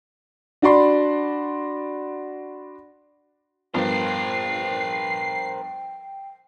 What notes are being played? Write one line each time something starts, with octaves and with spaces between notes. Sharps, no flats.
D4 F#4 D5 B5 C6
G2 F3 B3 A#4 C5 G5 C7